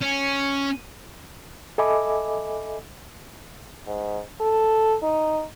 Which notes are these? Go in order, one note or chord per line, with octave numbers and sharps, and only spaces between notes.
C#4
A4 D#5 E5 G#5 B5 D6
G#2
A4
D#4